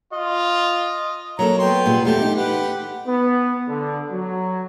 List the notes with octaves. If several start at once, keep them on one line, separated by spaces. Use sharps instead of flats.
F4 D#5
F#3 A#3 A4 A#5
B3 G5 C6
A#2 G3 G#4
E2 A3 G4 G5
D#4
G4 B4 F#5
B3
D3
F#3